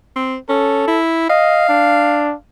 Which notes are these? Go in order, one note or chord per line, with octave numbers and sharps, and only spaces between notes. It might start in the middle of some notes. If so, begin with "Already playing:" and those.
C4
C#4 A4
E4
D#5 F5
D4